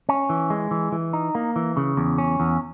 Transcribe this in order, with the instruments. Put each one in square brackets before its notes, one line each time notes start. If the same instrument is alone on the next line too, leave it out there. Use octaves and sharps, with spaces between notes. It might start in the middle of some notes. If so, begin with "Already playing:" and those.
[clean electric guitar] C#4
E3
G#3
E3
E3
D#4
A#3
E3
C#3
E2
C#4
E2